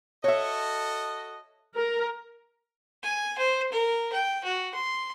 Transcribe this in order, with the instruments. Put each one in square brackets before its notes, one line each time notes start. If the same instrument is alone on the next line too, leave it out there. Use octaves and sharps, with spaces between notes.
[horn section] F#4 A4 D#5 [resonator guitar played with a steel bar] C#5 E5
[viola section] A#4
[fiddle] G#5
C5
A#4
G5
F#4
C6